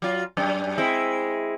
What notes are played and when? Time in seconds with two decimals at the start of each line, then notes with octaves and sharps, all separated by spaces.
0.02 F#3 F4
0.37 F#2
0.78 G#3 C4 E4